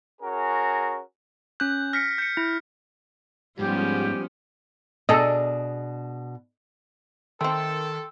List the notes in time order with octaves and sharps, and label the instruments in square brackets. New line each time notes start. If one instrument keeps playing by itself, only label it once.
[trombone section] C#4 F#4 G#4 A#4
[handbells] C#4 F#6 [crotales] G6
[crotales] F6 B6 C#7 [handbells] A#6
[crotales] G6 C#7
[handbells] E4
[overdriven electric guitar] G#2 [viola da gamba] F3 B3 C#4 [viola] G3 [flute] G4
[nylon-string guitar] B2 D4 G#4 [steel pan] A4 D#5
[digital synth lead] D#3 [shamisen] A3 C4 [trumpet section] A4 [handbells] G5 C6 E6